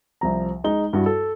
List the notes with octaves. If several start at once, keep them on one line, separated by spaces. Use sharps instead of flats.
C2 F3 A#5
G#3 D#4 G7
G2 E4 F#4
A4